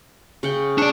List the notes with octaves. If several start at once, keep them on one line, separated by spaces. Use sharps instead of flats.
C#3 F#5 G5
D4 C#5 D5